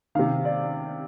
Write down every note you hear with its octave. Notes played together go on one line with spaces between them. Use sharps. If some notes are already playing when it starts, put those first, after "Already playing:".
C3 D#3 F5
D5